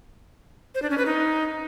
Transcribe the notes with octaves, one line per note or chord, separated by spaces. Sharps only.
C5
D4
C#4
B4
D#4